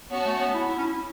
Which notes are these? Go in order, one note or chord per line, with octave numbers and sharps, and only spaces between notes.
B3 C#4 F#4 C#5 A5
A3
B3
E4
E4
C#4
E4